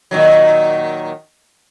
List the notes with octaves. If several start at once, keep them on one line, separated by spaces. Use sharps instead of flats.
A#2 D#3 F#3